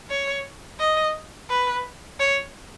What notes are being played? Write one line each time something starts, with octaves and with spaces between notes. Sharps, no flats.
C#5
D#5
B4
C#5